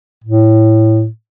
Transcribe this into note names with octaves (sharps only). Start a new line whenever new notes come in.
A2